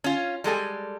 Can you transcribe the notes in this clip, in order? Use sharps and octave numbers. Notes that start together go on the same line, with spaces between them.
C#4 F4
G3 G#3 A4 G#5